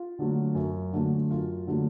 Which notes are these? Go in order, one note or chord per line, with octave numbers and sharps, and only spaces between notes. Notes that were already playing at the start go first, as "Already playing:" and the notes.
Already playing: F4
D3 F#3 A3
F#2
D3 F#3 A3
F#2 F4
D3 F#3 A3